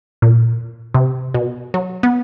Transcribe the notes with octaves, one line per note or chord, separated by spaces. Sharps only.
A#2
C3
B2
F#3
B3